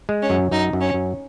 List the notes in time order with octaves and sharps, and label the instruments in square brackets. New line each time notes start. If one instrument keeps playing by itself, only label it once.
[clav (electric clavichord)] G#3
[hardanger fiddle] C#4
[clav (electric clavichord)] F#2
[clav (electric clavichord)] F#2 [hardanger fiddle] D#4
[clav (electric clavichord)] F#2
[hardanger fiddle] C#4
[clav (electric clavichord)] F#2